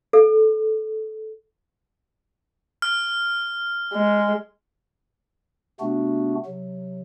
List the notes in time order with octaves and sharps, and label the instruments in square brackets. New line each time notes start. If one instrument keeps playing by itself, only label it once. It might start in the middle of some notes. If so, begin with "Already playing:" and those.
[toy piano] A4
[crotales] F6
[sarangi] G#3
[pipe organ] C3 A3 B3 D4 F#4
C3 F#3